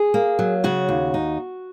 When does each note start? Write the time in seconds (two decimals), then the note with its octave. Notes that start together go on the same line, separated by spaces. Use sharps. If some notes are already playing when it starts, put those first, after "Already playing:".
Already playing: G#4
0.14 A#3
0.39 F#3
0.64 C#3 F#4
0.89 D#2
1.14 D#4